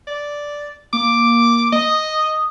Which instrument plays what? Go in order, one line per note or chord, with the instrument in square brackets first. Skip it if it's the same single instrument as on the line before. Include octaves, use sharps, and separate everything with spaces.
[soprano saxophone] D5
[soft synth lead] A#3 [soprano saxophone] D6
[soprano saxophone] D#5 [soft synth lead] D#6